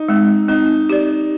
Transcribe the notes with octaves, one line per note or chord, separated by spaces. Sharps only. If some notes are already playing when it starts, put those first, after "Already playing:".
Already playing: D#4
G#3 C4
C4 D#4
G4 D5